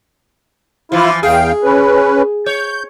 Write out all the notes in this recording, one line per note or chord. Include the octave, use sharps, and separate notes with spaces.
E3 F3 E4 F4
E2 G#4 F5 G5
C#4 B4
C#5 G6